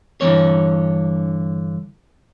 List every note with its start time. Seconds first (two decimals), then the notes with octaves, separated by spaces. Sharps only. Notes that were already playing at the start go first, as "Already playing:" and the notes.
0.21 G2 D3 E3 A#3 C#5